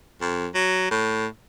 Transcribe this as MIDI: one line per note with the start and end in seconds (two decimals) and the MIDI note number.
0.21 0.47 41
0.54 0.89 54
0.91 1.26 45